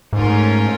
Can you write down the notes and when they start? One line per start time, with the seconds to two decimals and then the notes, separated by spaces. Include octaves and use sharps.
0.13 G#2 A3 C#4 F4 A#4